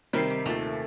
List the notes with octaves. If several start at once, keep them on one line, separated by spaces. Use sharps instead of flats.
C3 D#3 G3 C4 C7
G4
D#2 A#2 A3 A6